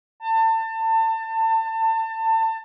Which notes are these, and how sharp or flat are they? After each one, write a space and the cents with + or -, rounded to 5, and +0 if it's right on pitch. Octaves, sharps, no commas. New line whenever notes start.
A5 +30